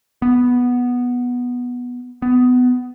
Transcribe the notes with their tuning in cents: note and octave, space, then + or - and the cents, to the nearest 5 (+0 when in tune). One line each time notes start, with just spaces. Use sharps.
B3 -5
B3 +20